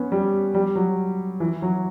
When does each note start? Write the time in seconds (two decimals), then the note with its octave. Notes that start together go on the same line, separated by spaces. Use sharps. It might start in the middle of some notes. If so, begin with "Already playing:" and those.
Already playing: B3 C#4
0.12 G3
0.54 G3
0.75 F#3
1.40 E3
1.62 F#3